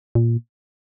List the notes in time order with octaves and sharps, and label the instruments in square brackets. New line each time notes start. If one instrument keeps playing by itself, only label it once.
[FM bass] A#2